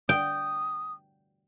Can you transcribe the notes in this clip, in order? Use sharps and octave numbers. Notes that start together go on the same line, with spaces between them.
G5 D#6